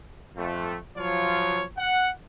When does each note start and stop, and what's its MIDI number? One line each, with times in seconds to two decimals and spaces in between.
0.36 0.78 41
0.36 0.78 57
0.97 1.65 53
0.97 1.65 54
0.97 1.65 65
0.97 1.65 73
1.78 2.08 78